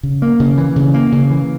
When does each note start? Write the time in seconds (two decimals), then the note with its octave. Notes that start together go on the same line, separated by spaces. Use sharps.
0.03 C#3
0.22 A#3
0.40 C#3
0.57 E3
0.76 C#3
0.94 A#3
1.12 C#3
1.30 E3